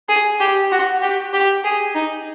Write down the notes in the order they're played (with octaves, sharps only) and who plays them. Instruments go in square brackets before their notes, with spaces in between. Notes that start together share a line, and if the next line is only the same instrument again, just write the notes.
[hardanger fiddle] G#4
G4
F#4
G4
G4
G#4
D#4